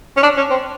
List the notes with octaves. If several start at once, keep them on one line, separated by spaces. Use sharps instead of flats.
C#4
D4
C#4
C4